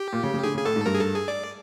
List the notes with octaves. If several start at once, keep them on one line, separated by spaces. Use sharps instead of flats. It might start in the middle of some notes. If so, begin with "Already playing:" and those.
Already playing: G4
A#2
C#3
C#3
D3 G#4
C#3
G#4
A2 A4
G#2
G2 A#4
G#4
A4
G#4
D5